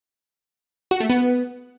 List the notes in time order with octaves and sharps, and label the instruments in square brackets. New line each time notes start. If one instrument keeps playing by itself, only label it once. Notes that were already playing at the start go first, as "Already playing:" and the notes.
[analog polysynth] F#4
A3
B3